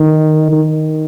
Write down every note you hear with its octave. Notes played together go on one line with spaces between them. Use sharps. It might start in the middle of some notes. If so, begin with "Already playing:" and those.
Already playing: D#3
D#3